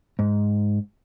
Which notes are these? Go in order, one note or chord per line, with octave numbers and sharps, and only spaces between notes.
G#2